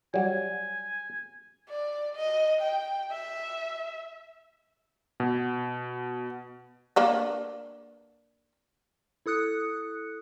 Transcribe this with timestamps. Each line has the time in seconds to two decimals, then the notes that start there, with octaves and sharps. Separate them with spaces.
0.14 F#3 G3 G#5
1.69 D5
2.16 D#5
2.62 G5
3.12 E5
5.20 B2
6.96 A#3 D4 B4
9.26 E4 A4 D#6 F#6 C#7